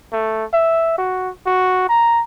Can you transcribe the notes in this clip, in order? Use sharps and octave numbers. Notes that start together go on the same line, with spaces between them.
A3
E5
F#4
F#4
A#5